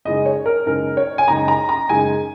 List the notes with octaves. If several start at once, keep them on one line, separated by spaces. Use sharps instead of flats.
F#2 C#3 G#3 D#4 D#5
C#5
A#4
F#2 C#3 G#3 D#4 A#4
C#5
G#5
F#2 C#3 G#3 D#4 A#5
A#5
A#5
F#2 C#3 G#3 D#4 G#5